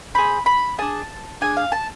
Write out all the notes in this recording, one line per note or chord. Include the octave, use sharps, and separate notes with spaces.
C4 G#4 B5
B5
D4 G#4 A5
D4 G#4 G#5
F5
A5